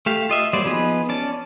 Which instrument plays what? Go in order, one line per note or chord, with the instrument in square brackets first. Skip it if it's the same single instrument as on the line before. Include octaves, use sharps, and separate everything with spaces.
[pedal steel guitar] A3 G4 F5
F4 D#5 E5
F#3 G3 A#3 C5 D5
F3 B3 D#4 G#4 B4
C#4 D5 A5